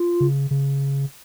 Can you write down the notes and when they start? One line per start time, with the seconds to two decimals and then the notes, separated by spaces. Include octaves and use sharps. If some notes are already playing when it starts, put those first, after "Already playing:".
Already playing: F4
0.20 C#3
0.51 C#3